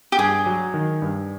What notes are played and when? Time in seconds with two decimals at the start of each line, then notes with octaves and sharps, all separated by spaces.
0.12 G4
0.18 G2 G#4
0.46 F#3
0.74 D#3
1.02 G2